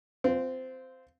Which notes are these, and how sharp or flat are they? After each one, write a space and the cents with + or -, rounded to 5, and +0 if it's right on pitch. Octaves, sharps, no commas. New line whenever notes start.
C4 -15 F4 +0